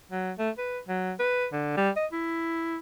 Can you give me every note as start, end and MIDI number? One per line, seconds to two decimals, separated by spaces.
0.12 0.32 54
0.38 0.50 57
0.58 0.79 71
0.88 1.13 54
1.19 1.47 71
1.52 1.73 50
1.77 1.90 55
1.96 2.06 75
2.12 2.78 64